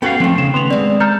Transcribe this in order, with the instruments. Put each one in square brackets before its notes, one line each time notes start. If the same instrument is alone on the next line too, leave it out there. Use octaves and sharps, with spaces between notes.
[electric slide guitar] B3 F#4 F5 [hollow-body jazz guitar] C#4 A4 G5
[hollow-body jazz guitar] D#3 A3 [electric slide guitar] F3 C4
[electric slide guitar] C#3 [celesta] E7
[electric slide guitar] B3 [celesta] C6 F7
[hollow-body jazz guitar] G#3 C4 [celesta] D5
[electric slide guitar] A4 [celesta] A#5 F6 G6